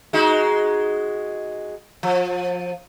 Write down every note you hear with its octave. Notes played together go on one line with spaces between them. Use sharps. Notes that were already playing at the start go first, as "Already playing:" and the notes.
G#3 D#4 F#4
F3